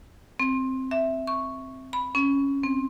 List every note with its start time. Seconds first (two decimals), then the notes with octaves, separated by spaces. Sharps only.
0.40 C4
0.91 E5
1.27 C#6
1.93 B5
2.15 C#4
2.63 C4